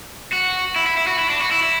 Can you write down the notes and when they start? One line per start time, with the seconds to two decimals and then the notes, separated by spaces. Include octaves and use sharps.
0.32 F#4
0.76 E4
0.86 E4
0.97 E4
1.07 F#4
1.19 E4
1.30 D4
1.41 F#4
1.51 E4
1.63 E4